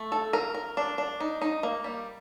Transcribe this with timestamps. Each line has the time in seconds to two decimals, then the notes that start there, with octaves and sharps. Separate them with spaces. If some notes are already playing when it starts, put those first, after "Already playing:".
Already playing: A3
0.12 A4
0.33 A#4
0.54 A#4
0.77 D4
0.98 D4
1.20 D#4
1.42 D#4
1.63 A#3
1.84 G3